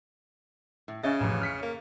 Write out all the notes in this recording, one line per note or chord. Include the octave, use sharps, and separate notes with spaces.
A2
C#3 C#4 D#5 E5 A6
A1 F2
F6 B6 C#7
A#3